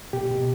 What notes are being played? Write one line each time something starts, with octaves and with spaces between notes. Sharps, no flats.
B2 G4
B2